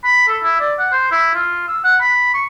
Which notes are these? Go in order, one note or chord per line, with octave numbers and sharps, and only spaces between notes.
B5
A4
E4
D5
F#5
C5
E4
F4
E6
F#5
B5
C#6